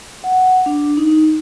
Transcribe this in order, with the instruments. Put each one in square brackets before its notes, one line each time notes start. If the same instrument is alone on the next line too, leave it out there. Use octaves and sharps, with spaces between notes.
[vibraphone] F#5
D4
D#4